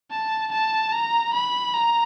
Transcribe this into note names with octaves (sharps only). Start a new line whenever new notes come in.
A5
A5
A#5
B5
A#5